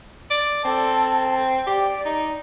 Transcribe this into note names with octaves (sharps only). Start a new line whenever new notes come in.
D5
C4 A4
G4 D5
D#4